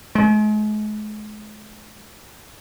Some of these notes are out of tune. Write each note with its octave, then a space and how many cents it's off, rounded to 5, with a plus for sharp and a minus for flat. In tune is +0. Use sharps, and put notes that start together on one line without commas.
G#3 +40